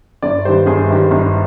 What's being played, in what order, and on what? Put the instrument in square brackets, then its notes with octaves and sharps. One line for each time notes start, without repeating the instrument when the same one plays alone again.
[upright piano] G1 D5
G2 D#3 G3 C5
G1 G#4
G2 D#3 G3
G1